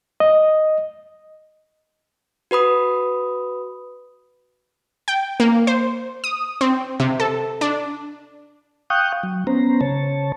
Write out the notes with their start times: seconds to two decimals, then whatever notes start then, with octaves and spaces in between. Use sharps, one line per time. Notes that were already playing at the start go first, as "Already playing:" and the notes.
0.20 D#5
2.51 F#4 B4 B5 D#6
5.08 G5
5.40 A#3
5.67 C5
6.24 D#6
6.61 C4
7.00 C3
7.20 A4
7.61 D4
8.90 F5 G5 C#6 D#6 F#6 G6
9.23 F#3
9.47 B3 C#4 C5 A#5
9.81 C#3 C#5 A5